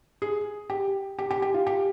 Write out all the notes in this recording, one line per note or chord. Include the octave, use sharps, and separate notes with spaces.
G#4
G4
G4
G4
G4
F4
G4